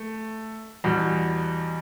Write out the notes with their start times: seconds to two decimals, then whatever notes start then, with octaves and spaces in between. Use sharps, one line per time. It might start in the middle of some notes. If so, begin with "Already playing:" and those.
Already playing: A3
0.84 E2 B2 G3